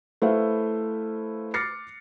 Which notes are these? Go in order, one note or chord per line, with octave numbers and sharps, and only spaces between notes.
A3 E4 B4 C5 E5 F5
D6 F6 A6 A#6 C7 C#7